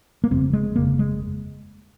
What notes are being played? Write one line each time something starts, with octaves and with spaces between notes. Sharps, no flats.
A#3
G1 F2 C#3 C4
G#3
G1 F2 C#3 A#3
G#3